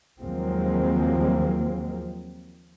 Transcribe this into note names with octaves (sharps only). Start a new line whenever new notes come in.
D#2 F3 F#3 G#3 A#3 C4